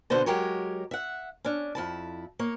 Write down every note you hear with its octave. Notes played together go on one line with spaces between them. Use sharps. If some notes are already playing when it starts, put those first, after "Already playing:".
B2 D3 B3 C5 A5
F#3 G#3 G4 A#4 C#5
E5 F#5
C#4 D4
F2 E4 A5
A#3 C#5